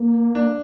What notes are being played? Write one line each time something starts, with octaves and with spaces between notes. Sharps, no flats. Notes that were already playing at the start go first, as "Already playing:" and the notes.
Already playing: A#3
D4